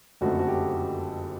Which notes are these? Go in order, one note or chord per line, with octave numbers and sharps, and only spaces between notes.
F#1 F2 D3 F3 A3 F#4
F#4
G4